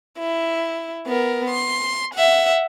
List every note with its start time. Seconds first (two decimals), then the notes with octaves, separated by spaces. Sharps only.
0.19 E4
1.07 B3 A#4
1.50 C6
2.14 E5 F#5